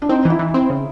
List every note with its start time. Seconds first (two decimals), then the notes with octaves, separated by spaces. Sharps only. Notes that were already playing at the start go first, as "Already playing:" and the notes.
0.02 D4
0.09 C4 D#4
0.25 E3
0.30 E4
0.39 E3
0.54 C4
0.70 C#3